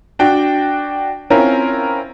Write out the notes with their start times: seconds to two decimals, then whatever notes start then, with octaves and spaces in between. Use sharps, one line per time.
0.19 D4 F#4 G5
1.30 C4 C#4 E4 F4 A#4